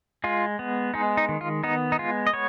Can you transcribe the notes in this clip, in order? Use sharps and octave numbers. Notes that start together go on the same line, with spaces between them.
G#3 F4
B3
G#3 D#4
D#4
D#3
F4
B3 D#4
D#4
G#3 F4
D#5
B3 C#5